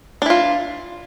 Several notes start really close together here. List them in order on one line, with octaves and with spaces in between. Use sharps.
D4 E3 F4